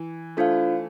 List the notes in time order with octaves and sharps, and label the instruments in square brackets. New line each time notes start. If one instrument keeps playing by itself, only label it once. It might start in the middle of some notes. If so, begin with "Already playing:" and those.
Already playing: [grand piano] E3
[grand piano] A3 [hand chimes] D4 F4 C5 F5